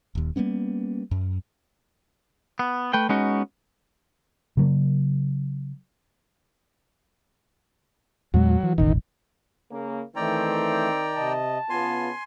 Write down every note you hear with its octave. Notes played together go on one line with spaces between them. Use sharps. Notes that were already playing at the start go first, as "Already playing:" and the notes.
D#1 D#2
G3 A#3 B3 C#4
F#2
B3
A3 B4 G5
G#3 B3 C#4 D#4 F#4
C#3 F#3 A#3
E2 A#2 F#3 G#3
E3
E1 A1 D#3
C#3 A#3
D#3 E3 A3 C4 D5 G5 A#5
C3 D#5 A5
C#3 B3 F4 G#5 C6